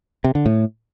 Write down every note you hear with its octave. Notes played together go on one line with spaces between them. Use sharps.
C3
D3
A2